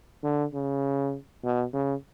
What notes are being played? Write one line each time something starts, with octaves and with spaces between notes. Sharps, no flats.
D3
C#3
B2
C#3